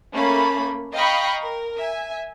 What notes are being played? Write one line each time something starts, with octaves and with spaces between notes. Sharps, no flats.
A3 A#3 C#4 B5
D#5 F5 G5 A#5 B5 C#6
A#4
E5 G#5